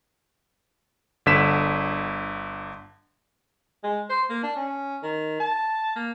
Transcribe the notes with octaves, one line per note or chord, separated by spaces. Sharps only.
G1 D3 B6 E7
G#3
C5
A#3
D4
C#4
D#3
A5
A#3